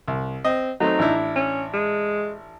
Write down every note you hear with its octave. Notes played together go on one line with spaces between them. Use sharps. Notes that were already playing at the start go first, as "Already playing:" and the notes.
C2
C4 D#5
F#3 A3 C4 D#4
A1 D4 E4
C#4
G#3